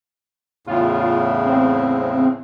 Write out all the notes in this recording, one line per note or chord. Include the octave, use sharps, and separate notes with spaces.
E2 A2 C#3 F4
C4